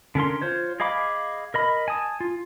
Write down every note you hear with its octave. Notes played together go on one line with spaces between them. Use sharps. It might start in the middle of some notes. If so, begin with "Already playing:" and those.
D3 C#4 A#4 C6
F4 C5 C#5
G#4 D#5 F5 B5 D6
A#4 D#5 B5
G#5 A5 D#6
F4